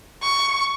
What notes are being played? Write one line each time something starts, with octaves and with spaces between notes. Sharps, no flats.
C#6